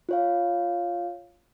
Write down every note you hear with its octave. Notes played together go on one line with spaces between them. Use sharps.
F4 C#5 F5